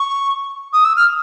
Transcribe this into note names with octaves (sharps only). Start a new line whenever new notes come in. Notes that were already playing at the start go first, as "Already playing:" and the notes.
Already playing: C#6
D#6
E6
F6